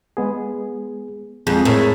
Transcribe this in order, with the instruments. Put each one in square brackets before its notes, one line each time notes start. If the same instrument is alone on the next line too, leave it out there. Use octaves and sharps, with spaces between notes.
[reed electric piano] G#3 B3 G#4
[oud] F2 [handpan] G#3 G#4
[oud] A2 [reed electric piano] A4 A#4 C#5